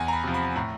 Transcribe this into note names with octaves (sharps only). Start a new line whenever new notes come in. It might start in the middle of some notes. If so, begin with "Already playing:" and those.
Already playing: E2 G#5
A#5
B5
C3 F3
B5
A2 A#5